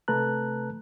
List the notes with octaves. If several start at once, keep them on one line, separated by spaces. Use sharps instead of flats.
C3 A3 B4 A5 A#5 F#6